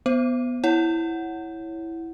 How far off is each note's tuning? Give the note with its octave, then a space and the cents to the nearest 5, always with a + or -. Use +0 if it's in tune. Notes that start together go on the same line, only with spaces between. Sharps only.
B3 +0 C5 +0
E4 +0 C#5 +0 F#5 +0